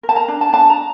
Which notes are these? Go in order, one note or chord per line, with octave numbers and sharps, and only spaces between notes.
A#4
A5
A#5
D4
A5
D4 A5
A#5